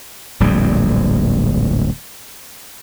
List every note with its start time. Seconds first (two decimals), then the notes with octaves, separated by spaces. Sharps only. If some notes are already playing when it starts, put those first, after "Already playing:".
0.40 D1 A#1 F2 G3